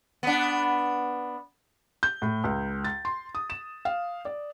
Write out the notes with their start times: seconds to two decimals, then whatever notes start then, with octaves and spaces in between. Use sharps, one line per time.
0.23 B3 D4
2.03 G6
2.22 A2
2.44 C#2
2.84 A6
3.05 C6
3.35 D#6
3.50 E7
3.85 F5
4.25 D5